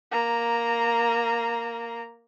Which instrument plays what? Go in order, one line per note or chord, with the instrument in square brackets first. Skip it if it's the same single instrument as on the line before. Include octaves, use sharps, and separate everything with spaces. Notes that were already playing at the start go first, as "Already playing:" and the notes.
[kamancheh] A#3 A#5